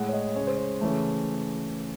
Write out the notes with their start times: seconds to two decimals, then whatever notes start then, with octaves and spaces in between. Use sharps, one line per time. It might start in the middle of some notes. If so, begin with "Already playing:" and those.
Already playing: A2 G#3 F#5
0.09 C#5
0.13 D#5
0.36 C#3 G#3 C#5
0.47 C5
0.58 C#5
0.81 C#3 E3 A3